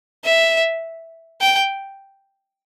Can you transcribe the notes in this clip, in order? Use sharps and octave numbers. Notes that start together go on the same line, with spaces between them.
E5
G5